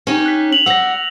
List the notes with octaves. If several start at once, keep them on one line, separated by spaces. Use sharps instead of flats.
C#4 D#4 G4
F#6 B6
F7 F#7
G3 G4 F#5 E6 A#6